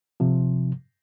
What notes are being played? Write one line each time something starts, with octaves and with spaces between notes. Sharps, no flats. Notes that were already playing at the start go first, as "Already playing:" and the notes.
C3 F3